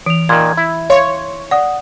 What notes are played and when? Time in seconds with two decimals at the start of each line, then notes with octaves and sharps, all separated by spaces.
0.06 E3 D7 F7
0.29 A#2 D#3 C6 G#6
0.57 E4
0.90 C#5 F5 C6 C#6
1.51 D5 F#5 D#6